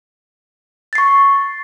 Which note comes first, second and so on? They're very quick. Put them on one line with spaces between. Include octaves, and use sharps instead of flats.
A6 C7 C#6